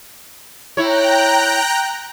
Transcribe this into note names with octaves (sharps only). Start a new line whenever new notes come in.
E4 C#5 G5 A#5 F#6